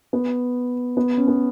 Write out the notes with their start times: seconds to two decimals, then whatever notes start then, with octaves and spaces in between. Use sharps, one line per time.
0.13 B3
0.97 B3
1.18 C#4
1.28 B3